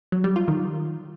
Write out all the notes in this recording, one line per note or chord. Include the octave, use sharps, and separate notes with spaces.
F#3
G3
F4
D#3